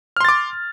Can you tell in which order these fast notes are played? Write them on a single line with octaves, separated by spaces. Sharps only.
F6 C6 A6 D6